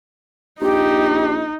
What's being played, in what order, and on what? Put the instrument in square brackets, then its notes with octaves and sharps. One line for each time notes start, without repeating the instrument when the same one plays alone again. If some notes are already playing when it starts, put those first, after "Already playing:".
[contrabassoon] A#1 [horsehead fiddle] D#4 [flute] G4